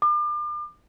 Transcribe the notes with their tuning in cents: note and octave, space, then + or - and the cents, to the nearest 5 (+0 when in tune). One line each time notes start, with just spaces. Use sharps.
D6 +40